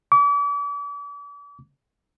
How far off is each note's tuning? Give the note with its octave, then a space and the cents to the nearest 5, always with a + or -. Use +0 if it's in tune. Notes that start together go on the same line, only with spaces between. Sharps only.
D6 -40